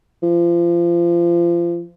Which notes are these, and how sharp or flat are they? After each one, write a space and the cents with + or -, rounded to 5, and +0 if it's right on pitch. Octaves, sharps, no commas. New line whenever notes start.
F3 -30